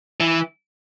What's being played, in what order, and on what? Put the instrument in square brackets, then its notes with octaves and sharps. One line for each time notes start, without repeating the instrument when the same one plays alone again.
[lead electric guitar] E3